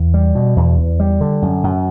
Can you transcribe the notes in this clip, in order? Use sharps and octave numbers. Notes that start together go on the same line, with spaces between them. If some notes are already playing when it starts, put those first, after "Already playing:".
Already playing: E2
G3
B2
E2
E2
G3
D3
F#2
F#2